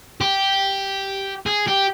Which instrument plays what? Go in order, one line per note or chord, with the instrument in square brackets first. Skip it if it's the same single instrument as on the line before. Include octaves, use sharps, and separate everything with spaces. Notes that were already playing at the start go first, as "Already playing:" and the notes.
[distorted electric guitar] G4
G#4
G4